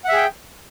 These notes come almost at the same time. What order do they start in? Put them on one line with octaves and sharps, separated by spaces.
F#5 E5 G#4 G5